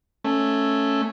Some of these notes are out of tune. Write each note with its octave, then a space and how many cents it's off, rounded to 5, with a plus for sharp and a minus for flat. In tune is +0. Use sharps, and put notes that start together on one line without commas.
A3 +0 C#4 +0